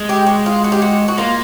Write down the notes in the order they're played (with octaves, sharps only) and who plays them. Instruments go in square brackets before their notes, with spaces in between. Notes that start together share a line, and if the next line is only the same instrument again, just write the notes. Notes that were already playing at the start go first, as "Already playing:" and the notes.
Already playing: [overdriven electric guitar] G#3
[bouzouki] G4
F#4
F4
F#4
G4
F#4
F#4
[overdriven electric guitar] A#3 [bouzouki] F4